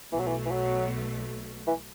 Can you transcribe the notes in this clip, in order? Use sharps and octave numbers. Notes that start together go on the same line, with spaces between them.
B1 B2 E3 A3
F#3
E3
E3
F#3
E3